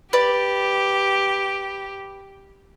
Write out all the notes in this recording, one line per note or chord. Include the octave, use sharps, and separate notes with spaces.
G4 B4 D5